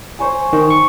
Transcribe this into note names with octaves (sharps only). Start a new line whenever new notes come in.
C5 C#5 G#5
D#3
C#6